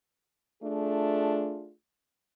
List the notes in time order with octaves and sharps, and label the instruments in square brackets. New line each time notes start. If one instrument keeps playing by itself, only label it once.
[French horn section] A3 D4 F4 G#4